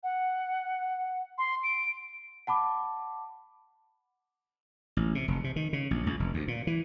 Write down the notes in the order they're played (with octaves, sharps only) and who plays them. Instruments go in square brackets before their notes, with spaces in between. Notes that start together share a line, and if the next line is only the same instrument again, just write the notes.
[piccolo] F#5
C6
D7
[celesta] F#5 A5 B5 D6
[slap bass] A1
C3
F1
C3
D#3
C#3
A#1
C#2
F1
D2
A#2
E3